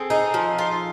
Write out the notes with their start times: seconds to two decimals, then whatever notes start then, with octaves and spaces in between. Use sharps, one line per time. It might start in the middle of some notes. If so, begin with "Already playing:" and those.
Already playing: C4 G#4 A4
0.10 D#4 G#4
0.34 F3
0.59 F4